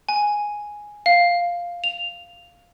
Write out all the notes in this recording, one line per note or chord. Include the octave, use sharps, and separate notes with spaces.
G#5
F5
F7